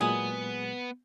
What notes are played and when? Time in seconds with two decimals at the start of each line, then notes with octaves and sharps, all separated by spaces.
0.01 A#2 F#3 G#3 B3 G#4